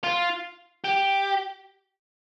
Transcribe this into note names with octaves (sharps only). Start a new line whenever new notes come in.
F4
G4